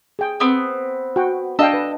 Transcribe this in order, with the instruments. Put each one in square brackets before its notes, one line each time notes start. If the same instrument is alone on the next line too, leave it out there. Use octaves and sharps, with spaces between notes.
[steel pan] G#4 G5
[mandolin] B3 C4
[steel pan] F#4 G5
[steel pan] D4 F5 G5 [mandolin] D#5 A5 E6
[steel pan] B4